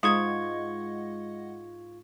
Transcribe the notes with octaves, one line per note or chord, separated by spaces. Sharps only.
G#2 G#3 F4 D#5 F#5 C#6 D#6 G#6